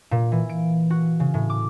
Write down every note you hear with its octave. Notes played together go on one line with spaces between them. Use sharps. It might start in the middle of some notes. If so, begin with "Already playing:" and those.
A#2
E3
D7
F#4
C#3
A2
D6